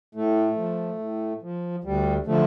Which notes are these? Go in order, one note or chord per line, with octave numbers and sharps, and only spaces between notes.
A2 A3
F3
A2
F3
D2 G3
D3 F3 A3